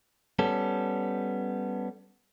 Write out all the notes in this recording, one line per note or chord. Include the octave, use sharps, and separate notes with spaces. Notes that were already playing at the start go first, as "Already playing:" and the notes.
G3 B3 C#4 A4